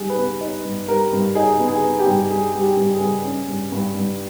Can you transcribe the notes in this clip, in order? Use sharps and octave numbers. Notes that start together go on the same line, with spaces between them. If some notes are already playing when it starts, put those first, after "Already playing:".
Already playing: G2 G3 D#4 G#4
B4
B3
D#4
G2
G3 A#4
G2
D#4 G#4
B3
G#4
B3
G4
G2
G3 G#4
G3
G4
G2
G#4
G2
C#4
G2
G2
G2